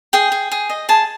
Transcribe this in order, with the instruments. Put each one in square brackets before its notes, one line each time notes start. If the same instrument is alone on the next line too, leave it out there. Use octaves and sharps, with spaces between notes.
[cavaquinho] G#4 G5
G#4
G#4
D#5
G#4 A5